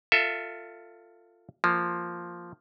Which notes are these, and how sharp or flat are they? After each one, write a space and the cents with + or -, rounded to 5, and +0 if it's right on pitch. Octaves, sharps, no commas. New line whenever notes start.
F4 +0 A4 +25 E5 +0
F3 +0 A#3 +0